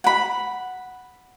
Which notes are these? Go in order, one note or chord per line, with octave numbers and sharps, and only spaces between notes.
F#5 B5